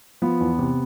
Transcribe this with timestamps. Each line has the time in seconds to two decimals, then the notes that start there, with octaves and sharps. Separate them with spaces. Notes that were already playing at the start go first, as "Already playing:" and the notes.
0.22 F3 B3
0.40 E2
0.59 C3